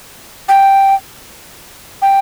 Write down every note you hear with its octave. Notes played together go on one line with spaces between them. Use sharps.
G5
G5